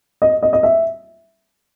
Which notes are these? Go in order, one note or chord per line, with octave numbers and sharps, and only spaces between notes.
D#5
D#5
D#5
E5